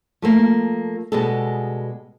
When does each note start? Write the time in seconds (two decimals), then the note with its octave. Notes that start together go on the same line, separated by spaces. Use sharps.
0.22 F3 A3 A#3
1.12 B2 G3 G#3 B3 G#4 A4